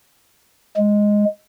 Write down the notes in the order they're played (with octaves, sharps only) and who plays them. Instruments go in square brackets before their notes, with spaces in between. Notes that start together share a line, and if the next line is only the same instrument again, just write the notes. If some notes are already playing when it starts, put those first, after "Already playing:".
[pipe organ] G#3